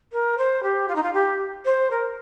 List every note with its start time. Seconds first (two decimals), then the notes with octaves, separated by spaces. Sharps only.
0.12 A#4
0.37 C5
0.62 G4
0.88 F4
0.95 D#4
1.02 F4
1.13 G4
1.65 C5
1.90 A#4